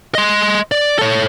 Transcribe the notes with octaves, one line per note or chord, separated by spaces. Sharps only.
D#5 C6
D5
A4 C#5